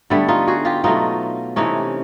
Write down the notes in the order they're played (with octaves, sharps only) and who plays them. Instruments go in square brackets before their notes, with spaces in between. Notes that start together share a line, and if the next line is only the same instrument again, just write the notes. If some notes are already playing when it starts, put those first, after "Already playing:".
[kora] D3 G3 A3 B3
D#4 F4
F#4 G#4
F4 G4
B2 F#3 A3 D#4 F4
C3 E3 A3 C#4 D#4